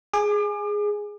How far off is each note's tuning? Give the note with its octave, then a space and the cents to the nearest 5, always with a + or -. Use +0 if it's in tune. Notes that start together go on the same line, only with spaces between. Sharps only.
G#4 +0 D6 +35